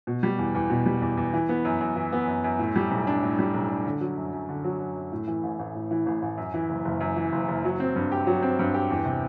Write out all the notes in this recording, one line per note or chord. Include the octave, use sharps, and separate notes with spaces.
B2
G3
E2
E2
B2
G3
E2
E2
E3
B3
F#2
F#2
E3
B3
F#2
F#2
A2
G3
B1
D4
A2
G3
B1
D4
D3
F#3
F#2
F#2
D3
F#3
F#2
F#2
A2
E3
A1
A1
A2
E3
A1
A1
F#2
E3
F#1
F#1
F#2
E3
F#1
F#1
F#3
C4
G2
G4
F#3
C4
G2
G4
E2
C3